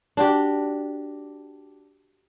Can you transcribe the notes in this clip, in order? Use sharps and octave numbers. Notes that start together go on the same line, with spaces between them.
D4 F#4 G4